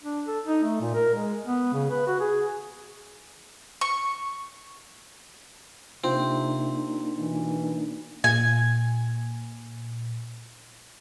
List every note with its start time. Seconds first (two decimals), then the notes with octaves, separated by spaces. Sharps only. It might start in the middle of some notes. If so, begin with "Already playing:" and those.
0.02 D4
0.26 A4
0.46 D#4
0.64 A3
0.81 A#2
0.94 A#4
1.14 G#3
1.47 B3
1.73 C#3
1.91 B4
2.07 F#4
2.20 G#4
3.81 C#6
6.04 C3 A#3 C4 D4 D#4 F4
7.15 B2 E3
8.24 A#2 G#5